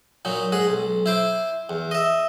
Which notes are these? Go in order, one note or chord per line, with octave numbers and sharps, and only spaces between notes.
A#2 F#3 D#4
G#2 G#4 F#5
B1
E4 C5 D6
E2
D#5 E5